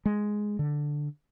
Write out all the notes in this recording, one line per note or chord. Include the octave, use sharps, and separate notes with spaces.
G#3
D3